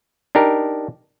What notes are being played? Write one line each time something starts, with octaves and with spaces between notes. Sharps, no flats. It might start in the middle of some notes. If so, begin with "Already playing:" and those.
D4 D#4 G4 A#4